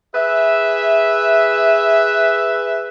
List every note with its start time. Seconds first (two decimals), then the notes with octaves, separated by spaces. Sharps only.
0.15 G#4 B4 E5